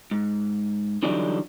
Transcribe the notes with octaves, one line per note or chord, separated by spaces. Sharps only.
G#2
D3 E3 F#3 G3 D4 D#4